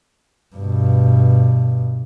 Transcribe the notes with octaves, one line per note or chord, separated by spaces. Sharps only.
G2 B2